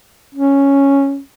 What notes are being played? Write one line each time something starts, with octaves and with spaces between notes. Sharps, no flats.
C#4